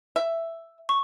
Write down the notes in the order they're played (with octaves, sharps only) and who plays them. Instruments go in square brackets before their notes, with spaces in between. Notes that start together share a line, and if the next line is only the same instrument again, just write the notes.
[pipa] E5
[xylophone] C#6